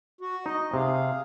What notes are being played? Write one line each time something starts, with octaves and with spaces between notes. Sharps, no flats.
F#4
D#4 D#5
C3 G#4 F5